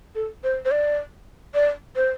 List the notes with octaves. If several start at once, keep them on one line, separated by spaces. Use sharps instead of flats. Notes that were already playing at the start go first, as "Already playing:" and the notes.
A4
C5
C5
D5
D5
C5